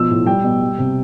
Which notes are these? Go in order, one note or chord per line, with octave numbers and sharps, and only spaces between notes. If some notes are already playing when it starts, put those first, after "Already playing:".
Already playing: B2 F3 E6
A2
G3 G5
B2
G3
C3